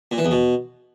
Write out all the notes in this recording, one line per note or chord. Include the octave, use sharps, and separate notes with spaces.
A#2
E3
E2
B2